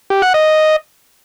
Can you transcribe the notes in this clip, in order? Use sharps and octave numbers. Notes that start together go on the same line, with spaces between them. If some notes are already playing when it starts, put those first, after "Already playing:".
G4
F#5
D#5